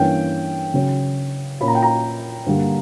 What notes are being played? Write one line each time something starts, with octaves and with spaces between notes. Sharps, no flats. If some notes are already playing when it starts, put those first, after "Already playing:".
Already playing: G2 E3 A#3 C#4 G5
C#3 F#3 C#4
A#2 A#3 C#4 B5
A#5
G5
A#5
G2 D3 G3 A#3